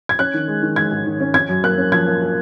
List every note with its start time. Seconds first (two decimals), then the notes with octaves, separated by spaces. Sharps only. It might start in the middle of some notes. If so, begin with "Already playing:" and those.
0.09 G#6
0.19 C#4 F#6
0.34 D#3
0.48 G#3
0.62 D#3
0.76 G#3 G#6
0.91 G#2
1.06 D#3
1.20 C#4
1.34 C#4 G#6
1.49 F#2
1.64 A#3 F#6
1.78 C#4
1.92 F3 G#6
2.07 A#3
2.21 A#3